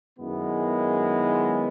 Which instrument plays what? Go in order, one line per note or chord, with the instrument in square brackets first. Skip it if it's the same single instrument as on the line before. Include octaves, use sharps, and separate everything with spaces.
[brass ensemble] F#2 D#3 G#3 B3 E4